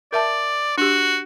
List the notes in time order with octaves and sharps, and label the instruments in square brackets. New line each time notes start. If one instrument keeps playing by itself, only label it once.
[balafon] A#4 E5 A5 [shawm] D5
[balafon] D4 G4 [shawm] F#4